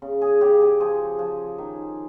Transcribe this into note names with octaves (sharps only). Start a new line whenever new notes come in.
C#3
G#4
C#3 G4
G#4
F3 G#4
F3
D#3